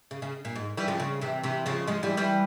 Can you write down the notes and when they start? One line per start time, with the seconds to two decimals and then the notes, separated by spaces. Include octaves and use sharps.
0.11 C#3
0.22 C#3
0.45 A#2
0.55 G#2
0.77 E3 G3
0.88 C#3 F3
1.00 C#3
1.21 C3 E3
1.43 C3 E3
1.66 C#3 F3
1.87 F3 G#3
2.03 E3 G3
2.17 E3 G3